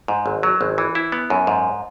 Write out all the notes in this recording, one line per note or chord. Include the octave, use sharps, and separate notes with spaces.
G#2
G#1
F#3
G#1
E3
E4
B3
F#2
G#2